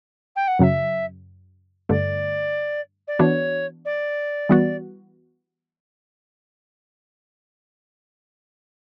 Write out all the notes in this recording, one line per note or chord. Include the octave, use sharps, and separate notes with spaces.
G5
F#5
F#2 C#3 F#3 E5 F#5
G2 D3 A3 D5
D5
E3 B3 D4 F#4 C#5
D5
E3 G3 B3 F#4